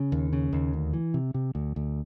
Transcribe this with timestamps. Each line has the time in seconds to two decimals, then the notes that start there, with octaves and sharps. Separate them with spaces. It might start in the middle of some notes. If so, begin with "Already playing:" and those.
Already playing: C#3
0.12 D#2
0.33 C#3
0.53 D#2
0.73 D2
0.93 E3
1.14 C3
1.34 C3
1.55 D2
1.76 D2